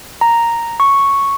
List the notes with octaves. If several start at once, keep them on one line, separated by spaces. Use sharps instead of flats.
A#5
C#6